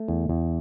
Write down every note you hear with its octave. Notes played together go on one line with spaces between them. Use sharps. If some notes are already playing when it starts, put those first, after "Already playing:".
Already playing: A3
E2
E2